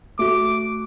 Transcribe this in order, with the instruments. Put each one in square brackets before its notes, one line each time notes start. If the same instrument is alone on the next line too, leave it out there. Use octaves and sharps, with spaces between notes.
[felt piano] A3 F#4 [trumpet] D6